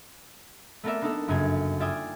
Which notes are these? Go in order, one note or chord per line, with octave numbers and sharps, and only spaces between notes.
A3 B3 C4 A#4 D5 E5
A#3 B3 D4 D#4 A4
G1 F#2 C#3 A#3 G#5
F4 D5 E5 G5 G#5 D#6